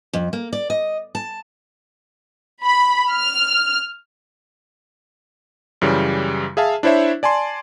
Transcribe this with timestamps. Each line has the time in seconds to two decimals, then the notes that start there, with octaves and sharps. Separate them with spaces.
0.13 F2
0.33 A#3
0.53 D5
0.70 D#5
1.15 A5
2.63 B5
3.10 F6
5.81 F#2 C#3 E3 G3
6.57 G#4 E5 F5 A5
6.83 D4 E4 C5 C#5 E5
7.23 D5 G#5 A5 C6